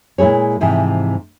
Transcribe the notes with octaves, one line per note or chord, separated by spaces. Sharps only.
A#2 G#3 E4 G#4 C#5
G#2 C3 E3 F3